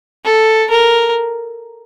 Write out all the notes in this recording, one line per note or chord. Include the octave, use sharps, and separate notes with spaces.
A4
A#4